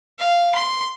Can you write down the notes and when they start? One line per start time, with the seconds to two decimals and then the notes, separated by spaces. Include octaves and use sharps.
0.19 F5
0.55 C6